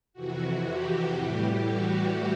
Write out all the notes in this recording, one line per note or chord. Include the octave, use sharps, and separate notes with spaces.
F2 C3 E3 F#4
G4
A2 E3 G3
F#4